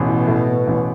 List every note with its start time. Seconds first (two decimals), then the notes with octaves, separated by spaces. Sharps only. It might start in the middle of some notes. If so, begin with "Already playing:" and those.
Already playing: A1 B2
0.08 E3
0.28 A2
0.47 B3
0.67 A1